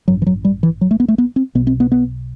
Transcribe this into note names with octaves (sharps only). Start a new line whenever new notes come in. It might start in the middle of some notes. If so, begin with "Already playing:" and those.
A1 G2 F#3
E3
F#3
G3
E3
F#3
A3
B3
A3
B3
C4
B1 B2 B3
C4
B3
B3